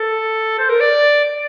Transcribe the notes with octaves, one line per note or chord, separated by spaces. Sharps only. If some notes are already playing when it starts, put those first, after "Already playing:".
Already playing: A4
C5
A#4
D5
D5